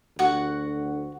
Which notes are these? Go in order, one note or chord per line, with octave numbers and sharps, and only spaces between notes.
D2 F#4 F#5